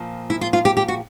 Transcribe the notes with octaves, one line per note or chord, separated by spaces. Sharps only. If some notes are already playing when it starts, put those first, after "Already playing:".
Already playing: A#2 F3
E4
F4
F4
G4
G4
F#4